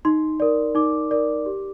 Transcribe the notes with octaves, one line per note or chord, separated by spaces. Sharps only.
D#4 C6
A#4 D5
D#4 D6
A#4 D5
G4